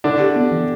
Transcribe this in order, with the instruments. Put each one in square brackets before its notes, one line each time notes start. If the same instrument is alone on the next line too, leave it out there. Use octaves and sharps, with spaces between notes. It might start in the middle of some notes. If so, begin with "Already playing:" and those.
[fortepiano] D3 D4 [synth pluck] E4
[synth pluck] G4
B3
E3